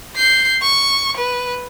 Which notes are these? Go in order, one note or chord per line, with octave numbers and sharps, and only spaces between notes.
G6 C7
C#6
B4